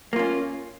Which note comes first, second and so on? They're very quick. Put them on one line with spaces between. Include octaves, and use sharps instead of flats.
A#3 F4 C#4